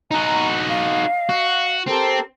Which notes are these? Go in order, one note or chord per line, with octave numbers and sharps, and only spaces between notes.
D#4 F#4 G#5 A#5
D#5 F5
F#4
C4 G4 A4 A#4